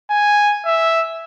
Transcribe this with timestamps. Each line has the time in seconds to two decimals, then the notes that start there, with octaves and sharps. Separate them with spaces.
0.10 G#5
0.66 E5